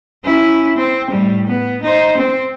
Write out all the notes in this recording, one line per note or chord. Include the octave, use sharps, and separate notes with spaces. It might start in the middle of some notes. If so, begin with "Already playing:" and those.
C#4 E4
C4
A2 G3
B3
D#4 C5
C4